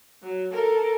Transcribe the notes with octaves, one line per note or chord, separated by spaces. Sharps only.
F#3
A4 A#4